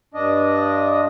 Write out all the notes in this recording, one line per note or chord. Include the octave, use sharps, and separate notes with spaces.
G2 D4 D#5